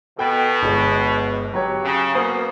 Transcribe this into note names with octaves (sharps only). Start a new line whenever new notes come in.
B2 A4 G5
G1 G#3
F#3 G4 C#5
C#3
A#3 B3 F#4 C5 D#6